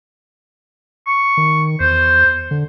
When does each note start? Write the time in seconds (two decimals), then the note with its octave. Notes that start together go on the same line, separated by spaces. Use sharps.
1.07 C#6
1.37 D#3
1.80 E2 C5
2.51 D3